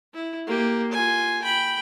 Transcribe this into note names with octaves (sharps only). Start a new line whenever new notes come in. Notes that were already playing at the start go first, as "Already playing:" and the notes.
E4
A#3 G4
F4 G#5
G5 B5